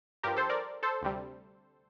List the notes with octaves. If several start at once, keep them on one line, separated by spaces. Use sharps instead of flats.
G2 F3 G4 A#4
A4 C5
A#4 D5
A4 C5
D2 C3 G3